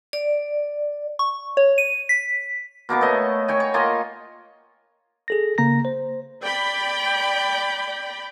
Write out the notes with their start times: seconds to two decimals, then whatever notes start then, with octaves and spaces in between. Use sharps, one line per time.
0.13 D5
1.19 C#6
1.57 C#5
1.78 D#7
2.09 B6
2.89 B2 A#3 B3 D6
3.01 A3 C#5 D#5
3.48 C#5 G5 G#5
3.60 C#5
3.74 A#3 F4 D#5 G#5
5.28 G#4 A4 A#6
5.58 C#3 A#3 A#5 A#6
5.85 C5
6.42 D5 G5 B5